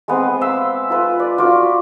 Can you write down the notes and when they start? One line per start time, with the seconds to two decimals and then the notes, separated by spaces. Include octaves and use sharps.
0.08 G#3 B3 C4 C6
0.41 F5 B5 C6 E6
0.90 F4 B4
1.19 D5
1.38 F4 F#4 D5